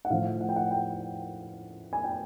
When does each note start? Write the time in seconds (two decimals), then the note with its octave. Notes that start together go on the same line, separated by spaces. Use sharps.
0.05 F#5
0.10 A2 F3 F5
0.41 F#5
0.49 G5
0.56 F#5
0.71 G5
1.93 G#5
2.04 G5